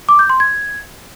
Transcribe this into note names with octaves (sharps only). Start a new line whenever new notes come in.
D6
G6
C6
G#6